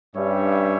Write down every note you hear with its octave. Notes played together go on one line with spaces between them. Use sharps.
G2 G3 C#4 G4 C#5 E5